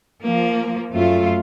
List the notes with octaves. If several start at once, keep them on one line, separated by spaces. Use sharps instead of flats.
F3 A#3
F#2 A3 F4